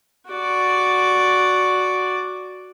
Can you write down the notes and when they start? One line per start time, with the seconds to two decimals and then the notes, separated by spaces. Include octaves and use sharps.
0.29 F#4 D5